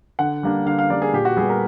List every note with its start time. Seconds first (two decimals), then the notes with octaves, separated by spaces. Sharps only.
0.19 D3 F#5
0.43 G3 A#3 D4
0.66 D3 F5
0.79 F5
0.90 G3 A#3 D4 D5
1.02 G#4
1.14 A#2 G4
1.25 F#4
1.37 G3 B3 G#4
1.50 A#4